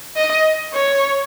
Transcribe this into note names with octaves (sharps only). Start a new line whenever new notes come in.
D#5
C#5